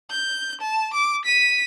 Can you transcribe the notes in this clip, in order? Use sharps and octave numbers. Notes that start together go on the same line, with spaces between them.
G6
A5
D6
B6 D#7